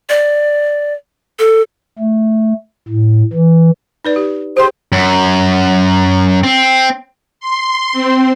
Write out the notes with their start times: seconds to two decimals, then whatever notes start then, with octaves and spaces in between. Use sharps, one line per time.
0.09 D5
1.39 A4
1.99 A3
2.88 A2
3.33 E3
4.05 D#4 B4 D5
4.16 G4
4.57 G4 G#4 C5 G5
4.92 F#2
6.43 C4
7.40 C6
7.93 C4